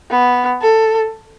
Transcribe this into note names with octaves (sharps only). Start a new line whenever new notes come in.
B3
A4